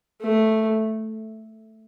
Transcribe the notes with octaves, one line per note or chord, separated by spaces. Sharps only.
A3